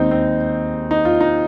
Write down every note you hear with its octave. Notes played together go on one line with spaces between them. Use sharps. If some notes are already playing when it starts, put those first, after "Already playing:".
Already playing: D#2 D#3 G#3 C4 D#4
C4
D#4
F4
D#4